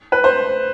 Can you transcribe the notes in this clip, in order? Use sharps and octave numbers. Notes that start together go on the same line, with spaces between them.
B4
C5